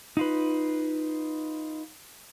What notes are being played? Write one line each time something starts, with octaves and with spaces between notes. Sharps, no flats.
D#4 F4 B4